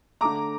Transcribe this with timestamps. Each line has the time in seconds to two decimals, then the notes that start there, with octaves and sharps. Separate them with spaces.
0.21 D3 A3 A#5 D6